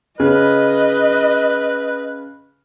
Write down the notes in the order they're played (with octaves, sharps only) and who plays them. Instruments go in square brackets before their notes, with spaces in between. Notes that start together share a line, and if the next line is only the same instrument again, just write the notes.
[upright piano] C#3 [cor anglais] B4 [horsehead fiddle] D#5